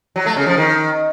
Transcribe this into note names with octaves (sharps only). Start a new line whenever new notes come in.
F#3
A3
C#3
F3
D#3